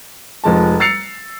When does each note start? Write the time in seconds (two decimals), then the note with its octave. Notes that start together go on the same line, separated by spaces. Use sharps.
0.44 F1 F2 G#3 A5
0.80 E6 A6 C7 C#7 F7